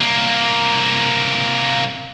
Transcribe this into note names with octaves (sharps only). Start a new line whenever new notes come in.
C2 A#3